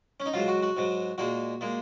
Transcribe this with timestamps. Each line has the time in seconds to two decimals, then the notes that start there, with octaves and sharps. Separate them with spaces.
0.20 C#4
0.26 D#4
0.33 G#2 F#3 F4
0.48 F#4
0.62 F#4
0.77 G#2 F#3
1.18 A#2 G#3 F#4
1.61 A#2 G#3